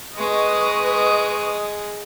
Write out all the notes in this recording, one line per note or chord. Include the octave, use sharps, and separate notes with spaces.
G#3 B4 D#5 C#6 D#6